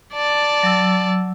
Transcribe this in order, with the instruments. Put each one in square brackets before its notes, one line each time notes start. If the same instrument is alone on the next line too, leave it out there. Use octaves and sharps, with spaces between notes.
[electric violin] D5 A5
[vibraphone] F#3 E6